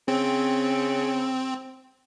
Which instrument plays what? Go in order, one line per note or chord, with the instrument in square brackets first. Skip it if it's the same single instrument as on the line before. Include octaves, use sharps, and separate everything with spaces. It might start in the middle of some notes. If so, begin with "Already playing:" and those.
[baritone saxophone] C#3 [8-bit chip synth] C4